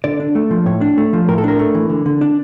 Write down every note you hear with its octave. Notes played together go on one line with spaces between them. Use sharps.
D3 D5
D4
A3
F3
A2 C#5
D4
A3
F3
A2 A#4
A4
D4 A#4
A3
E3
D3
D3
D4